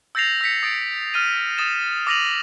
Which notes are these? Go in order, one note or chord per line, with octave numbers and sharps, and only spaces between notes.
E6 G6 A6 A#6 C7 F7
E6 A#6 B6 C#7
D#6 A6 D7
E6 F6 A6 D#7
D#6 A6 E7
D6 E6 A#6 D#7 F7 F#7